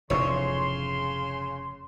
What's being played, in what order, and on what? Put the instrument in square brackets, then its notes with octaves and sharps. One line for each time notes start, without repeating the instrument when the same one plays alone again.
[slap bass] F1 E2 G#2 [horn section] C#3 C6 [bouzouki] C#5